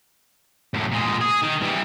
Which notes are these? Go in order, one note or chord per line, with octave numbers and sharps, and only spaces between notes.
F#2 A2
A#2 G#3
G#4
D#3
E3 G3